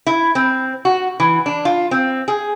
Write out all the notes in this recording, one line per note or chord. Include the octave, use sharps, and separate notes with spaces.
E4
C4
F#4
E3
D4
F4
C4
G#4